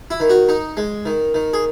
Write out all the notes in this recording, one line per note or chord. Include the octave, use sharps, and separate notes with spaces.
E4
D#3
F#4
D#4
G#3
D#3
D#3
G#4